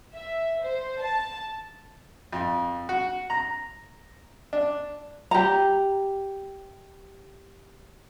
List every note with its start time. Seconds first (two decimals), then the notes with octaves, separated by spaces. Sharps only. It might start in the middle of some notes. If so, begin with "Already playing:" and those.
0.14 E5
0.62 C5
1.00 A5
2.33 F2
2.89 F#4
3.30 A#5
4.53 D4
5.31 G4 A#5